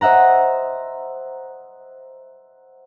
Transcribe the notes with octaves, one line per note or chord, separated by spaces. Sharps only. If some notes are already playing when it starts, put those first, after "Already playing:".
C5 D#5 E5 F#5 A#5